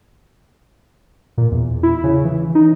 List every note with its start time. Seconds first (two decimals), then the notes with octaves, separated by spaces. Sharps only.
1.38 A#2
1.52 E2
1.83 E4
2.04 C#3
2.25 E3
2.55 D#4